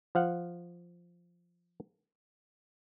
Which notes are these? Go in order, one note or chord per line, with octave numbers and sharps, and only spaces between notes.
F3 F5 F#5